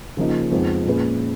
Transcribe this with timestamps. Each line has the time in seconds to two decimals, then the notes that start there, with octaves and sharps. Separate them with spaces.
0.17 C#3 F3 A#3 D#4
0.51 F2 F3 G#3 B3 D#4
0.85 A#2 G#3 C#4 G#4 B4